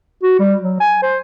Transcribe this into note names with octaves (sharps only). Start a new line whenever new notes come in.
F#4
G3
F#3
G#5
C5